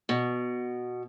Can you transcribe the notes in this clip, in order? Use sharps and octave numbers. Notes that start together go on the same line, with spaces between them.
B2